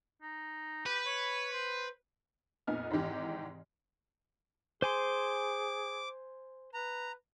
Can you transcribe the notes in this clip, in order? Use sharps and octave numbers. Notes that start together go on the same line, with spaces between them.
D#4
G4 B4
C#5
C5
F2 A#2 B3 D#4 G#5 F6
G#1 G#2 C3 D#3 E3 G4
G#4 C5 G#5 C6 D6
B4 A#5